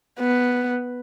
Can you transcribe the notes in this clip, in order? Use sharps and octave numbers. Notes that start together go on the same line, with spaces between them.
B3